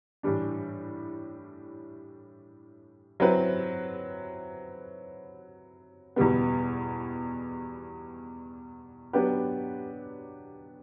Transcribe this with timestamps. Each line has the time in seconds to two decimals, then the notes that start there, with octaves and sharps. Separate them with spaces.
0.23 A2 E3 G3 D4
3.20 F#3 C4 E4 B4
6.16 E2 B2 G3 B3
9.13 F#3 B3 D4 G4 B4